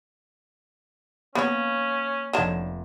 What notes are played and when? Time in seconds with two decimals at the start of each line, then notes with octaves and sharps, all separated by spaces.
1.35 A#3 B3 C#4 C#5 B5
2.33 F1 D3 D#3 F#3 E7